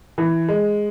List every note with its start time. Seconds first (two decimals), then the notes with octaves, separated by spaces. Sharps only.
0.18 E3
0.48 G#3